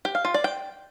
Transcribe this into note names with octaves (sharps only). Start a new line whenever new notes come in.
G4
F5
F4
D5
G5